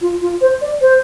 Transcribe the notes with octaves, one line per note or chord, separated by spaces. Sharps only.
F4
F4
C5
D5
C5